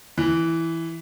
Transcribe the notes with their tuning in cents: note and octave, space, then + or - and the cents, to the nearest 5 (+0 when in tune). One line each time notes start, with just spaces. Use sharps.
E3 +0